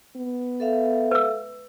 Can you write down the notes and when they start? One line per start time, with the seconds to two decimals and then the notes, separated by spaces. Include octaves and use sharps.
0.16 B3
0.60 A4 E5 F5
1.11 B4 E6